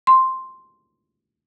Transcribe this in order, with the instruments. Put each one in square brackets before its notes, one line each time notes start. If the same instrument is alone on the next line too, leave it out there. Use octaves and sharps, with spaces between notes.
[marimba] C6